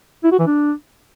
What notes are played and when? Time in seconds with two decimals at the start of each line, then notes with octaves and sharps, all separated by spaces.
0.24 E4
0.32 F#4
0.39 E3
0.47 D4